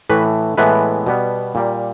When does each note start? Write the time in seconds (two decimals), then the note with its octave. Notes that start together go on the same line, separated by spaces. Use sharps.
0.10 A2 E3 A3 B4
0.58 A2 E3 G#3 B3 B4
1.07 B2 G3 B3
1.55 A#2 G3 A#3